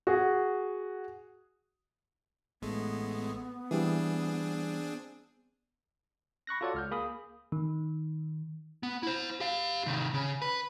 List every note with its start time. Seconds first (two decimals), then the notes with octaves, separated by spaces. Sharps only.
0.07 F#4 G#4
2.62 A1 G#3 A3 B3
3.71 E3 G3 C4 D4 G#4
6.47 B5 C#6 F#6 A#6
6.61 F4 F#4 A4 C#5 D5 F#5
6.74 C#2 F6 G6
6.91 A#3 G#4 B5 D#6
7.52 D#3
8.83 B3
9.03 E4 C5
9.40 G4 F5
9.87 C3 D#3
10.14 C#3
10.42 B4